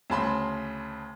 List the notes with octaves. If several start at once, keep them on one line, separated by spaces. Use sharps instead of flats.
D2 C#3 A5 B5 C6